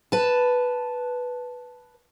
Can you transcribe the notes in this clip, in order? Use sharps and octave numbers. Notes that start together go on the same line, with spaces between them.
B4 A5